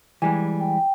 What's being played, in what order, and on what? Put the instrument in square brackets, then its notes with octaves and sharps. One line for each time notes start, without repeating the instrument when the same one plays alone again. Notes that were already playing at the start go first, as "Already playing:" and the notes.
[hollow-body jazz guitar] E3 G3 G#3 [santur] G#5
[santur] G5